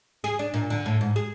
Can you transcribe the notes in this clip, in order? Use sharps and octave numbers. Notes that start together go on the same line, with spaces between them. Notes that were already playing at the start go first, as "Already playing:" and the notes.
G#4
D4
A#2
D3
A2
G#2
G#4